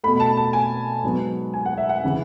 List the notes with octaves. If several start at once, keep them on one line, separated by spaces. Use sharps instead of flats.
B2 A3 B5
A5
A5
G#5
G#2 F#3 B3
G#5
F#5
E5
F#5
C#3 E3